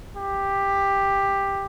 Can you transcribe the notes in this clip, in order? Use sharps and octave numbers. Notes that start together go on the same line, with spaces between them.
G4